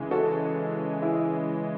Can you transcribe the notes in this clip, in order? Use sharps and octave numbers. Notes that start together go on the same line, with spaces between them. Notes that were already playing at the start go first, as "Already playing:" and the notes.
Already playing: C#3 E3 G#3
F#4 A4
E4 G#4